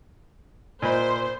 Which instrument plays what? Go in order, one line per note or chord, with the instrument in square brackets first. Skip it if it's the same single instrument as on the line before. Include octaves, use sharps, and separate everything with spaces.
[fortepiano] A#2 D#5 B5 [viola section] C5